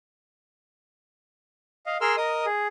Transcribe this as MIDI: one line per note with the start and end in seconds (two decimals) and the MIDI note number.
1.86 1.97 75
1.86 1.97 77
2.01 2.16 68
2.01 2.16 70
2.01 2.16 84
2.01 2.16 88
2.01 2.16 89
2.17 2.46 70
2.17 2.46 75
2.17 2.46 87
2.46 2.67 68